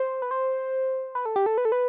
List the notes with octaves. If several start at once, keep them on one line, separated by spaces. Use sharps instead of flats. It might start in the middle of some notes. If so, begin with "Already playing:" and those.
Already playing: C5
B4
C5
B4
A4
G4
A4
B4
A4
B4